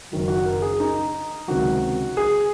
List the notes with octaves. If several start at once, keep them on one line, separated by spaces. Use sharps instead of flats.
F#1 F#2 D#3 F#3
F#4
A#4
G#4
D#4
C#2 C3 D#3 F#3 F#4
G#4